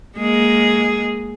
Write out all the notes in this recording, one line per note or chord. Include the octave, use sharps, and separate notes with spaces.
G#3 A#3 G#4